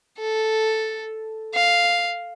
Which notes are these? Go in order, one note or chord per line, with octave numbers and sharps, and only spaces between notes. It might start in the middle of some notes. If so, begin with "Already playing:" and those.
A4
F5